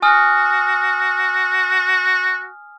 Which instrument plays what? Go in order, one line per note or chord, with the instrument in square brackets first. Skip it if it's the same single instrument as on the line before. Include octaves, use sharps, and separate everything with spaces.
[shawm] F#4 [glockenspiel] G#5 D#6 F6